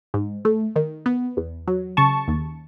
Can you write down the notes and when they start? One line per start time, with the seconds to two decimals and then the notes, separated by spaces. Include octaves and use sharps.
0.14 G#2
0.45 A3
0.76 D#3
1.06 B3
1.37 E2
1.68 F#3
1.97 C#3 A5 C#6
2.28 D#2